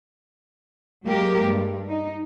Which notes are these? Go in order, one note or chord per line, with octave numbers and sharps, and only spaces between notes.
F#3 G#3 A#3 G4 A#4
G2
D#4